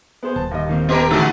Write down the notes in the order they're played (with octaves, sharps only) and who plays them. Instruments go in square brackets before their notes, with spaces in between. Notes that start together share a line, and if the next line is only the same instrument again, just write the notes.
[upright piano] B3 G#4 C5
[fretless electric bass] D#1 [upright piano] A5
[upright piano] D#2 D#5
[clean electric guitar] D#3 A#3 C4
[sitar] B3 G4 A#4 [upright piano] D#5 A5 C6
[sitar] D3 F#4 [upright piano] A3 G#4 A4